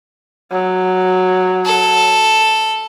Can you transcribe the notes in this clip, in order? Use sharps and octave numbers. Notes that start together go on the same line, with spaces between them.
F#3
A4